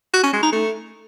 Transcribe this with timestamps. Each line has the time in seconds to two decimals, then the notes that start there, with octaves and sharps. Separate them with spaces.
0.14 F#4
0.23 C#4
0.33 G#3
0.43 D#4
0.52 A3